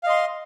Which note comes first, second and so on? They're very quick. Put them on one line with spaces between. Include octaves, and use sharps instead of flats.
F5 D#5 C6